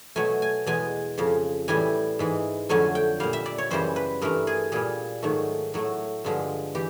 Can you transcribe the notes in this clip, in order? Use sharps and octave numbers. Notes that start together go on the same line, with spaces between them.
B2 F#3 A3 G#5
G#5
E2 B2 G#3 G#5
F2 C#3 F3
A2 E3 G3 G#5
G#2 E3 G#3
F2 D3 F#3 A3 G#5
G5
A#2 G3 F5
E5
D5
C#5
F#2 C#3 E3 G3 C5
B4
G2 E3 A3 A#4
G#4
A#2 G3 G#4
G#2 D#3 F#3 A3
A2 F#3 A3
G2 D3 F3 G#3
E3 G4